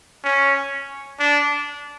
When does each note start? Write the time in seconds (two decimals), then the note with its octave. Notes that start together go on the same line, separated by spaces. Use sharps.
0.24 C#4
1.19 D4